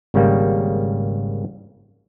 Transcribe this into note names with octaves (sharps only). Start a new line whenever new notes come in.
G#1 C#3 G3 A#3